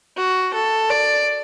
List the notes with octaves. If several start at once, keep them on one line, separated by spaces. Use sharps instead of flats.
F#4
A4
D5